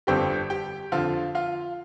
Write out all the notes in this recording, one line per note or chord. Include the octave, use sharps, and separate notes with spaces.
G1 F2 D3 G3 C4 G4 G5
G4 G5
F2 D3 F3 F4 F5
F4 F5